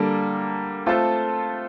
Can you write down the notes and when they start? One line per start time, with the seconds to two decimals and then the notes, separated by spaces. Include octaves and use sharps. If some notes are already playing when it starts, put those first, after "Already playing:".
Already playing: D3 G3 A#3 A4
0.86 A3 C4 F4 A4 C5